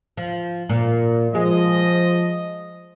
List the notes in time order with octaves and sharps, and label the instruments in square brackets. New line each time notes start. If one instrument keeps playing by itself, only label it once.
[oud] F3
A#2
[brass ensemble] F3 D#5 [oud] G#3